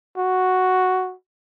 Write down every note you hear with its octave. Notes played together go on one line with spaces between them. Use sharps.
F#4